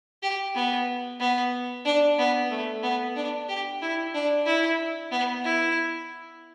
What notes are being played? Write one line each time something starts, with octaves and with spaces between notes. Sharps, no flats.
G4
B3
B3
D4
B3
A3
B3
D4
G4
E4
D4
E4
B3
E4